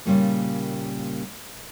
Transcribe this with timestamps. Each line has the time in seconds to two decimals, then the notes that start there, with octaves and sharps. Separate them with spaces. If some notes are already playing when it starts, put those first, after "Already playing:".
0.06 A#2 C#3 G3 A#3